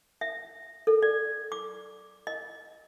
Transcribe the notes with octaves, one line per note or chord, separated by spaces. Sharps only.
E5
A4
D5
D6
D#5